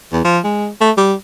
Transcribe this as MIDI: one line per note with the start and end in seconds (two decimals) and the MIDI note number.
0.13 0.24 40
0.25 0.39 53
0.44 0.68 56
0.81 0.91 57
0.97 1.14 55